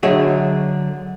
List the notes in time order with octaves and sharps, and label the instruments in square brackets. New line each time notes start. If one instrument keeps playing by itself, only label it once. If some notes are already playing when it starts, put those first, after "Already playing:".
[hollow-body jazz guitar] D3 F#3 G#4 C#5 D#5 E5